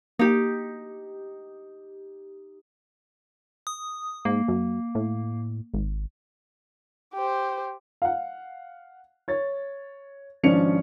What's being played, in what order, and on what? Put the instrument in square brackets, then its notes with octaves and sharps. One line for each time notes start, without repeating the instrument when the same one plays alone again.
[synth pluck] A#3 [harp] D#4 G4
[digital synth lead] D#6
[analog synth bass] G#2 [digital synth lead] A#3
[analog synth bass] F#2
A2
G#1
[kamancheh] G4 C5
[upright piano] F5 F#5
C#5 A6
G#1 F3 C#4 D4 C#7 F7